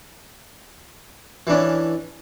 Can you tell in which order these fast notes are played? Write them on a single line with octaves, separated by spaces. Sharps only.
E3 D4 C#4